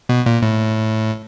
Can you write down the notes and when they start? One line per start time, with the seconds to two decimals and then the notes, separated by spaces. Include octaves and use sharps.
0.09 B2
0.26 A#2
0.42 A2